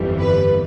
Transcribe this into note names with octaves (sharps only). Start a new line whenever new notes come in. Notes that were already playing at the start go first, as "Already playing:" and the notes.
Already playing: G1 F2 E3 G3
B4